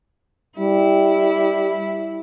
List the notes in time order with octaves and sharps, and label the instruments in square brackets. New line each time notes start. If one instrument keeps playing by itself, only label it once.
[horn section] G3 [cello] E4